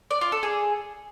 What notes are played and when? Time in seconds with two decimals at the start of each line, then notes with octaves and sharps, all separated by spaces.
0.11 D5
0.21 F4
0.32 A4
0.43 G#4